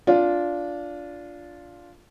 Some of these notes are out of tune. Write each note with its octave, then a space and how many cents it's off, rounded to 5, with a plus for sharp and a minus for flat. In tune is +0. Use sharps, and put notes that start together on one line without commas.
D4 -15 F4 +0